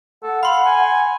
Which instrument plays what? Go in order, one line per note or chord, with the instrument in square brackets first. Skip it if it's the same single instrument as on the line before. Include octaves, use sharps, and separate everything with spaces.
[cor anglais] A4 [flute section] F#5
[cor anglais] F5 [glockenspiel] B5 C6
[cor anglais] G#5